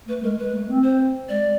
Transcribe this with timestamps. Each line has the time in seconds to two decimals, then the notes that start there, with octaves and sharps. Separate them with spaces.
0.08 A3 B4
0.23 G#3 A#4
0.39 G#3 B4
0.54 A3
0.69 C4
0.83 C5
1.29 G#3 D5